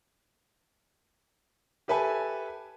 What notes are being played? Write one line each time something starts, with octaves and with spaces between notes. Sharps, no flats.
G4 A4 B4 E5 G#5 A5